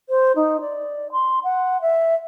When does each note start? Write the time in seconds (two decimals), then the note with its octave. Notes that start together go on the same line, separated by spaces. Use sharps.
0.09 C5
0.36 D#4
0.61 D5
1.12 C6
1.44 F#5
1.82 E5